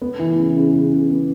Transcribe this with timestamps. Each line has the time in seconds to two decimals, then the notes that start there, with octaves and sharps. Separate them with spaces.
0.02 B3
0.19 E3
0.38 C#3
0.56 C#3
0.74 C#3
0.91 C#3
1.10 B3